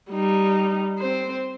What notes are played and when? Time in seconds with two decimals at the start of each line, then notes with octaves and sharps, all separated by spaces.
0.10 G3 D#4
0.99 C4 C5